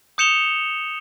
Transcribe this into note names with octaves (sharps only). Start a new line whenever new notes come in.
D#6 G6 C#7 E7 F7 G7